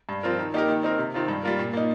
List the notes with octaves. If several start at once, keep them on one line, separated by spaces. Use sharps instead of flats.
G2
F3 C4 F4 A#4
D#3
A#3 D#4 G4 A#4
D#3
C4 D#4 A#4
C3
D#3 C4 F4
G2
G3 A#3 F4 A#4
A#2
A#3 D#4